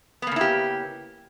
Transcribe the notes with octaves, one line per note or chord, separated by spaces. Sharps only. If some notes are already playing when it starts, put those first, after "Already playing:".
C#3 A#3 B3 E4 G4